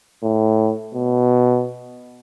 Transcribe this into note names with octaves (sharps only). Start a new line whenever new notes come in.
A2
B2